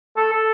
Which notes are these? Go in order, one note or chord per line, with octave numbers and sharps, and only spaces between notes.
A4
A4